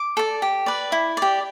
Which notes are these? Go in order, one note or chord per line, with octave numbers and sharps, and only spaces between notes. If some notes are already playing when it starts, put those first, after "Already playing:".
Already playing: D6
A4 D5
G4
B4 D5
E4
G4 D5